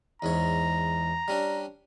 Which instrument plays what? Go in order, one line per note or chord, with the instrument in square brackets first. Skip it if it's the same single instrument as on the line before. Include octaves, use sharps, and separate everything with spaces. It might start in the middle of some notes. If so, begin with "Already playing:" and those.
[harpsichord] E2 G#2 C#5 [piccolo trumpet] A#5
[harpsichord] G3 C#4 D4